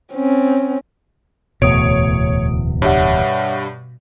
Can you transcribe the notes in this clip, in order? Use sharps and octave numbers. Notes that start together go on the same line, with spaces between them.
C4 C#4
D1 E2 B2 A3 C#5 D#6 D7
G2 G3 C#5 E5 F#5